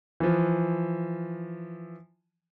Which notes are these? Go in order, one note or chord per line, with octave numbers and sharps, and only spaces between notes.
E3 F3